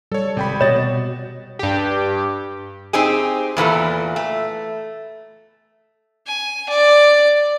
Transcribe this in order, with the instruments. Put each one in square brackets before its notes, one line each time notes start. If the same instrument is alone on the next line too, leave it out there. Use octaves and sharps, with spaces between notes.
[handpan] G3 [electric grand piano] A4 C#5
[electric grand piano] G#1 G5 B5 [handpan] C3
[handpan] B2 D#5 [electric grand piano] F#4 A6 E7 [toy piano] C#5
[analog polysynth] G2 G4
[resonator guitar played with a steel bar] C4 D#4 G4 G#4
E2 A#2 E3 A4
A3
[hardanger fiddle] G#5
D5